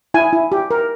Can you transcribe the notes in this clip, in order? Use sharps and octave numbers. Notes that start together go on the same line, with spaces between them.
E4 G#5
E4
G4
A#4